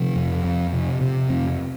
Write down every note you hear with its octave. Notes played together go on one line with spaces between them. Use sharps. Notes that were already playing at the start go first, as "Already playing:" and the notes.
Already playing: C3 F3
F2
F2
C3
C3
F2